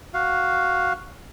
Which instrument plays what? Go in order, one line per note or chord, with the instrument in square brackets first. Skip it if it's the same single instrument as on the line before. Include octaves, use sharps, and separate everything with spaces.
[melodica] F#4 F5